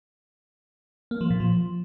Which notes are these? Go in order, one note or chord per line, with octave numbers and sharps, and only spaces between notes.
A#3
F3
A#2
F3